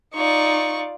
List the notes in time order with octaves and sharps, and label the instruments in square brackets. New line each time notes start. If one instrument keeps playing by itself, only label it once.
[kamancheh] D#4 C#6 [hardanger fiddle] F4 D5